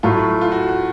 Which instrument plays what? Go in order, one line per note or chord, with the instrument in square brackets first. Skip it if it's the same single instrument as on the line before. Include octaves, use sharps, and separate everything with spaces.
[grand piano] A2 F#3 A3 [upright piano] F4
[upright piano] F4
F#4
F#4